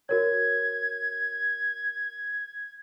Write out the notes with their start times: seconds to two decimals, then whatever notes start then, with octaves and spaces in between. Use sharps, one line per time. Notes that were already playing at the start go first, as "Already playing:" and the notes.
0.09 F#4 A#4 C#5 G#6